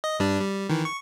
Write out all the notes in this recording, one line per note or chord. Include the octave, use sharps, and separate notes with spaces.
D#5
G2 G3 D4
G3
D#3 E3
C#6